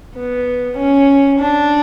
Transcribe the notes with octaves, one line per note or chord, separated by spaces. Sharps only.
B3
C#4
D4